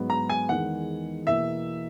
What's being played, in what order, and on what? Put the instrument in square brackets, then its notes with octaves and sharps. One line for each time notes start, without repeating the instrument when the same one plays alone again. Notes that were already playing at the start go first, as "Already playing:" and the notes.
Already playing: [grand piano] G#2 F#3 B3
[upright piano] A#5
G#5
[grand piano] E2 D#3 G#3 [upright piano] F#5
[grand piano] E2 B2 A#3 E4 [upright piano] E5